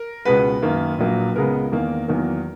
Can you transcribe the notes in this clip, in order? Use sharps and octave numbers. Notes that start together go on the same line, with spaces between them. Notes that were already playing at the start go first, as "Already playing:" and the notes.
Already playing: A#4
C#2 B2 G#3 B3 B4
F#2 D#3 A#3
A#1 A#2 F#3 A#3
C#2 C#3 G#3 B3 A#4
E2 D#3 A#3
E2 D#3 F#3 A#3